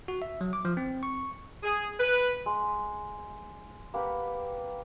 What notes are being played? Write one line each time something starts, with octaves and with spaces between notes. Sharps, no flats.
F#4
E5
F#3
D6
F3
C4
C#6
G#4
B4
G#3
A#3 G4 B4 F#5